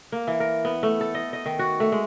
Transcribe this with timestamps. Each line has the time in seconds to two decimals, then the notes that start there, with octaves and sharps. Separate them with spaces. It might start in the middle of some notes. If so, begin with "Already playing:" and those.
0.12 A#3
0.27 E3
0.40 A#4
0.65 B3
0.83 A3
1.01 A4
1.14 D#5
1.33 D#5
1.46 D#3
1.59 F#4
1.80 A3
1.92 G#3